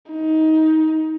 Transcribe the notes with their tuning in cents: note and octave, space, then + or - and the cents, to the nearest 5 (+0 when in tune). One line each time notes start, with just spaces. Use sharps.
D#4 +20